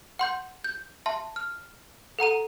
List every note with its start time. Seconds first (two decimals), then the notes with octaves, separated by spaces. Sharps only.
0.19 F#5 C6 G6
0.64 G6
1.06 E5 A5 C6
1.36 F6
2.19 A4 F#5 A#5 D#7